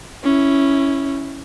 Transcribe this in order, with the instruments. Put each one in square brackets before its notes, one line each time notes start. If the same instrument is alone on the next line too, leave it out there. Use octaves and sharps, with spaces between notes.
[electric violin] C#4 E4